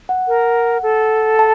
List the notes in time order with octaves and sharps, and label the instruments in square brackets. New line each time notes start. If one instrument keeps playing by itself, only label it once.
[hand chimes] F#5
[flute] A#4
A4
[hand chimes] A5